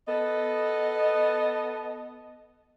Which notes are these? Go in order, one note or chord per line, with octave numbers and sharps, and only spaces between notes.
B3 A4 D#5